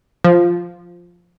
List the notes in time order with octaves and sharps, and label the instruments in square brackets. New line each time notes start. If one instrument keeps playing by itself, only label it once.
[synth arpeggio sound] F3